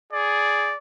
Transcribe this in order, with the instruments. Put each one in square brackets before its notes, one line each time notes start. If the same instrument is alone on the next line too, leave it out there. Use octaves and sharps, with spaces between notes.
[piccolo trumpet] G#4 [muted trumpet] D5